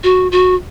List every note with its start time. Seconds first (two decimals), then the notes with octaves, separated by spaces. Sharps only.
0.04 F#4
0.32 F#4